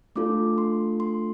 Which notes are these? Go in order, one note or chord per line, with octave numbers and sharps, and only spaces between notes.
A3 D4 F4 A4 D6
C6
C6